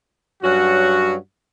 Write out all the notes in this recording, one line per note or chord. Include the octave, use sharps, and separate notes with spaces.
G2 F#3 C#4 F#4